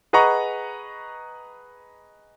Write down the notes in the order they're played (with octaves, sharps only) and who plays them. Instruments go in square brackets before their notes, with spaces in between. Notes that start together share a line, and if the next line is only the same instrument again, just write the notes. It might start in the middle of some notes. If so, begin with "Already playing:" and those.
[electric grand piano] G#4 B4 D#5 F#5 A#5 C#6